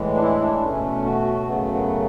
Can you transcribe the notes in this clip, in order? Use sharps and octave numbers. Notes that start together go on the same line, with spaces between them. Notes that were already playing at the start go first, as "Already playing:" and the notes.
Already playing: A2 E3 G#3
D4
E4
D4
B2 A3 C#4
F#4
F#2 C#3 F#3 A3 B3
B3